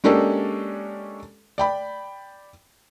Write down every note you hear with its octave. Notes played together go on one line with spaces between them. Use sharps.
G#3 A#3 C#4 D4 G4 A4
D5 G5 B5